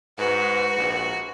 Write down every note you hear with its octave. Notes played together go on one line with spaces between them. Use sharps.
G#2 F#4 B4
A#1